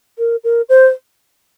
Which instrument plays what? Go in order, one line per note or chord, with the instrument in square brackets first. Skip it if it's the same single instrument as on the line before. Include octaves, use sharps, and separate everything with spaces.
[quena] A#4
A#4
C5